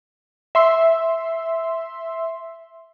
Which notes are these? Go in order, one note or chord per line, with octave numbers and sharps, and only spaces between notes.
E5 C6